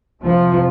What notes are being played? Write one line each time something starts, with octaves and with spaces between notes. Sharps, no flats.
F2 C3 F3